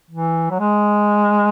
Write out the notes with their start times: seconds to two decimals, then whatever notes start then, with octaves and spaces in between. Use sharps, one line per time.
0.11 E3
0.51 F#3
0.59 G#3